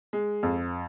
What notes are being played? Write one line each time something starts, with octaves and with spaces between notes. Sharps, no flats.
G#3
F2